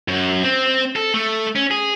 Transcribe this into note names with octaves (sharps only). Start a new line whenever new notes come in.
F#2
C4
A4
A3
C#4
G#4